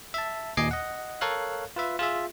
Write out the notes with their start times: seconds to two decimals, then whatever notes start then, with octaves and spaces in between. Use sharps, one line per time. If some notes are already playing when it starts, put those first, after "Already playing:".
0.14 E5 A5
0.57 D#2 A#2 D#5 G#5 D6 C7
0.71 D#5 F#5
1.21 A4 A#4 C#5 F5 F#6
1.76 F4 B4 E5
1.99 F4 G#4 E5